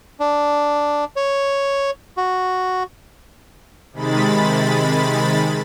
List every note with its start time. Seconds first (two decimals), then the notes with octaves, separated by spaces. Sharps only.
0.20 D4
1.16 C#5
2.17 F#4
3.93 C3 D#3 G#3 B5 A6